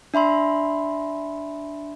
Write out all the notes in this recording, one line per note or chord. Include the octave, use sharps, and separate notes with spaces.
D4 E5 B5 C6